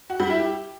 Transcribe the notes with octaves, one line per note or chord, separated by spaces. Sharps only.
F#4
G3
E4
G4